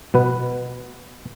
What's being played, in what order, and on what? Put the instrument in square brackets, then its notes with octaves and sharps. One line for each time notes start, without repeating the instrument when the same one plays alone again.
[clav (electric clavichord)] B2 B3 B4